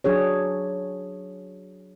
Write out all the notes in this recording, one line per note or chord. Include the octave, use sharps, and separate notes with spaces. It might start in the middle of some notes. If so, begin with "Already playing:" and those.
F#3 D4 G#4 C#5